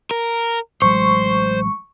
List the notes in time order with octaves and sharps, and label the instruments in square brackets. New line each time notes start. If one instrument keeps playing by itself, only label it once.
[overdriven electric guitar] A#4
[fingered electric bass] A1 F#3 G#3 [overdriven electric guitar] C5 [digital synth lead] C#6